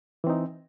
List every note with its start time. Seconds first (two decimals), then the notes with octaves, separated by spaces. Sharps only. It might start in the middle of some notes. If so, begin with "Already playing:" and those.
0.24 E3
0.27 C4
0.30 D#4